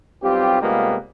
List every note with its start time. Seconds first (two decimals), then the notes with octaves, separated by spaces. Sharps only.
0.23 B1 G3 C4 F4 G4
0.62 C3 G3 G#3 A#3 B3 F4